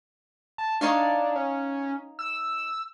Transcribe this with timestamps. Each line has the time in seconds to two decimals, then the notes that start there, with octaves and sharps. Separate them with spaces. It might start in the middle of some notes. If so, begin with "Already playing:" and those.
0.58 A5
0.81 D4 D#4 C#5 F5
1.35 C#4
2.19 E6